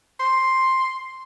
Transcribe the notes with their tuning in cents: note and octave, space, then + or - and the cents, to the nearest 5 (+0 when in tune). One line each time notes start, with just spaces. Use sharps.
C6 +5